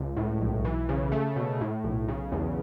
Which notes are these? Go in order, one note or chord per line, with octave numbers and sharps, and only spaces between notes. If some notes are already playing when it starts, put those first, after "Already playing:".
Already playing: C#2
A2
B1
E3
C#3
A3
B2
A2
B1
C#3
E2